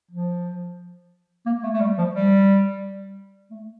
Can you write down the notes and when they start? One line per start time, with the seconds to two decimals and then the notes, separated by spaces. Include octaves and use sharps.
0.11 F3
1.46 A#3
1.64 A3
1.74 A3
1.80 G3
1.98 F3
2.15 G3
3.51 A3